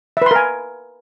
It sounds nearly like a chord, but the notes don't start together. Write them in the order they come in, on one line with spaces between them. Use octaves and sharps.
E5 B4 C6 A#4 G#5